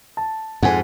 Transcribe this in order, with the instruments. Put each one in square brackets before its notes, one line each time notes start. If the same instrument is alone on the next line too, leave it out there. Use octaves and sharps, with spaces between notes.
[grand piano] A5
[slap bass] F2 G#2 [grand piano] F#5 G#5